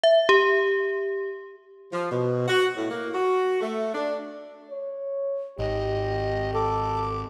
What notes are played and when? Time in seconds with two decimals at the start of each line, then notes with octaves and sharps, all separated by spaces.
0.04 E5
0.29 G4
1.92 F3
2.11 B2
2.48 F#4
2.76 A2
2.91 A#3
3.14 F#4
3.61 A3
3.94 D4
4.71 C#5
5.59 G#1 G4 D#5
6.54 A4 D6